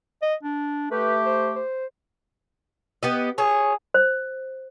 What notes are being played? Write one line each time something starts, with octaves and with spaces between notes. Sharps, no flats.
D#5
D4
A3 G4 B4
C5
C5
B3 G4 D#5
G#4 C#5
C5